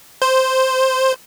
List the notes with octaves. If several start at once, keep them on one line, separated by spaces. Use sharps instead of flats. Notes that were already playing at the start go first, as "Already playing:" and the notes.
C5